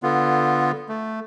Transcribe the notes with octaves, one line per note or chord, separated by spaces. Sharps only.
D3 B3 F4
A3